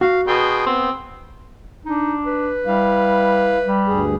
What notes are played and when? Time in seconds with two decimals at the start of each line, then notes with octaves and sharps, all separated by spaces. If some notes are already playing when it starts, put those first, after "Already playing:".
0.01 F#4 F5
0.27 B2 G#4 G5 C6
0.66 B3 C4
1.86 D4 D#4
2.26 B4
2.67 G3 E4 F5
3.67 G3
3.87 D2 G2 G#4